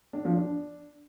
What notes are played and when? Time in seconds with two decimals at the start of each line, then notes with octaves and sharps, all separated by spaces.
0.13 D4
0.25 F3
0.36 D4